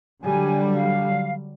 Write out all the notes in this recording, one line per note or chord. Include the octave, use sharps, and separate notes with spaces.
D3 F#3 G3 G#5
F5